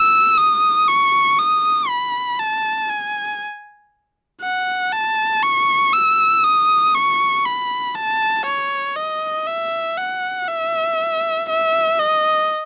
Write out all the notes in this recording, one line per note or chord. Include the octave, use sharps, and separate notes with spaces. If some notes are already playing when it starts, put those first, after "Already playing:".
Already playing: E6
D#6
C#6
D#6
B5
A5
G#5
F#5
A5
C#6
E6
D#6
C#6
B5
A5
C#5
D#5
E5
F#5
E5
E5
D#5